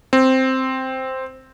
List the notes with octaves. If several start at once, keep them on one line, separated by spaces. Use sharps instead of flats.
C4